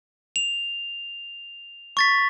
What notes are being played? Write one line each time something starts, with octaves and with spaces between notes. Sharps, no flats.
F7
C#6 A6 B6